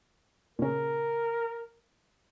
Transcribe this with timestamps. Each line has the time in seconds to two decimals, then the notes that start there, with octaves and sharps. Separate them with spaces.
0.59 A#2 C#3 A#4